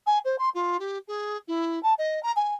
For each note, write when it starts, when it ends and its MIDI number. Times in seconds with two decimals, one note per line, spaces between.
0.06 0.18 80
0.24 0.35 72
0.38 0.49 84
0.54 0.77 65
0.79 0.98 67
1.07 1.37 68
1.47 1.81 64
1.83 1.93 81
1.98 2.21 75
2.23 2.31 82
2.36 2.54 80